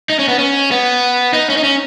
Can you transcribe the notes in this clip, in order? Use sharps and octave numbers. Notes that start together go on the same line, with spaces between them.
D#4
C#4
B3
C#4
B3
D#4
C#4
D#4
C#4